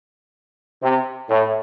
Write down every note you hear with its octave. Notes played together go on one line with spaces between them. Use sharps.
C3
A2